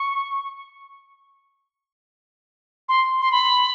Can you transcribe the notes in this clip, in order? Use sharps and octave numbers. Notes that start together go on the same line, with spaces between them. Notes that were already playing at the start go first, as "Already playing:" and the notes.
Already playing: C#6
C6
C6
B5